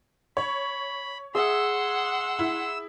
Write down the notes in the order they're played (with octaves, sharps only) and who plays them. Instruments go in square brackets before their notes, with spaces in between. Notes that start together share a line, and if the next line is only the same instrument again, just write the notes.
[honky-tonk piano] C#5 [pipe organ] B5
[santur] G#4 E5 [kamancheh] F#5 C6 [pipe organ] E6
[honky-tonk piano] E4